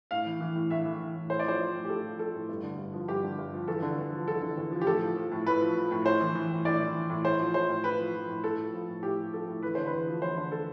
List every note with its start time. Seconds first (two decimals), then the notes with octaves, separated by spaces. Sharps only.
0.11 A2 F5
0.26 E3
0.41 E3
0.55 A2
0.70 A2 E5
0.85 E3
1.00 E3
1.15 A2
1.30 A2 C5
1.39 D5
1.44 F3 C5
1.60 F3
1.74 A2
1.85 G4
1.89 A2 A4
2.05 F3
2.19 F3 A4
2.34 A2
2.49 G2
2.63 D3
2.78 G2
2.93 F3
3.08 G2 G4
3.23 D3
3.38 G2
3.53 F3
3.68 E2 A4
3.82 D3
3.98 E2
4.12 F3
4.28 E2 A4
4.42 D3
4.57 E2
4.72 F3
4.81 G4
4.86 A2 A4
5.01 F3
5.16 F3
5.31 A2
5.46 A2 B4
5.61 F3
5.76 F3
5.91 A2
6.06 A2 C5
6.21 E3
6.35 E3
6.50 A2
6.65 A2 D5
6.80 E3
6.95 E3
7.10 A2
7.25 A2 C5
7.40 F3
7.54 F3 C5
7.69 A2
7.84 A2 B4
7.99 F3
8.14 F3
8.28 A2
8.43 A2 A4
8.58 F3
8.73 F3
8.88 A2
9.03 A2 G4
9.18 F3
9.33 F3 A4
9.48 A2
9.62 E2 B4
9.75 D3 C5
9.87 B4
9.93 E2
10.07 F3
10.22 E2 C5
10.37 D3
10.52 A4